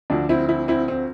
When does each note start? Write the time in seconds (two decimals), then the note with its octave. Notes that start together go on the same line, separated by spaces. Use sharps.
0.10 D2 D3 F3 D4
0.29 C4 E4
0.49 C4 E4
0.68 C4 E4
0.88 C4